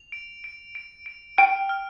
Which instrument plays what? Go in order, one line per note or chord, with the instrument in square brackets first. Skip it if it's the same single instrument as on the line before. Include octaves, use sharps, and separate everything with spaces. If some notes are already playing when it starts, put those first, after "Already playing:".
Already playing: [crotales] F7
D7
D7
D7
D7
[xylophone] G5 [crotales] F6
[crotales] F6